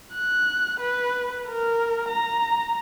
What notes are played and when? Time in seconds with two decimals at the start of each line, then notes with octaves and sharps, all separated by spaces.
0.13 F#6
0.80 B4
1.48 A#4
2.09 A#5